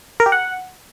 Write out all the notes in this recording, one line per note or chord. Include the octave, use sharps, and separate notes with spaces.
A#4
G4
F#5